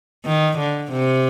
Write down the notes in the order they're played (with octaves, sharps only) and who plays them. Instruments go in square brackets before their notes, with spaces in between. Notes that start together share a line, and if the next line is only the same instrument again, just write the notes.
[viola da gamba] D#3
D3
C3